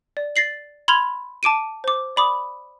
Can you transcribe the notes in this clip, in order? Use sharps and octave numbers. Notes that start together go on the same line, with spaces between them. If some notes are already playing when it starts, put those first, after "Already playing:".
D5
A6 A#6 C7 F#7
B5 C6 F6 G#6 F7
A5 D6 D7 D#7
C5 D6
D5 B5 D6 D#6